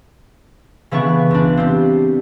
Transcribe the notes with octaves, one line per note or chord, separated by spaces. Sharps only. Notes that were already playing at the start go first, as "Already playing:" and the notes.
C#3 E3 B3 D4 C#6
C#2 D4
G3 C4